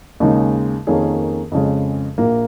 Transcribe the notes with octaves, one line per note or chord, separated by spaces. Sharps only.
D#2 C#3 G#3 D#4 G#4
F2 D#3 A#3 C#4 G#4
F2 C#3 G#3
A#1 A#2 A#3